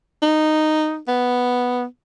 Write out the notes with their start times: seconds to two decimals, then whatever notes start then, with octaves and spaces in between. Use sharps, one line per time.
0.23 D#4
1.08 B3